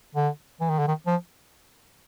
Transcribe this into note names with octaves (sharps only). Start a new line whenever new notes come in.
D3
E3
D#3
D3
D#3
F3